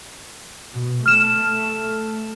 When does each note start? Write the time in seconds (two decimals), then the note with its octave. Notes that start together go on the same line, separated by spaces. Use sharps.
0.73 B2
1.06 A3 F6 E7